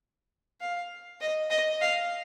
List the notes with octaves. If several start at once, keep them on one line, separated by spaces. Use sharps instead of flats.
F5
D#5
D#5
F5